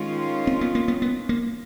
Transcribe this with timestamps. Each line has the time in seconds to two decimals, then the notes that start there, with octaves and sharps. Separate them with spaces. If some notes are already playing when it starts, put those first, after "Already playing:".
Already playing: D#3 G#3 C#4 F4
0.47 C4
0.61 B3
0.75 A#3
0.88 B3
1.02 B3
1.29 A#3